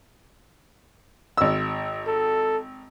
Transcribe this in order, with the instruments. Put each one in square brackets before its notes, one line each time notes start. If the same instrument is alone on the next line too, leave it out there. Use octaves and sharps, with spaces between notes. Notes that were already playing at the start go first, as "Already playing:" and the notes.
[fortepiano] G#1 E6
[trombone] A4